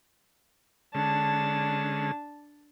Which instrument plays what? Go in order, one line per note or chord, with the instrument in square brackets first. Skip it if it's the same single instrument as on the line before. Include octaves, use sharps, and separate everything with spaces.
[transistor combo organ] D3 G#3 C#4 [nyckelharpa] D4 A5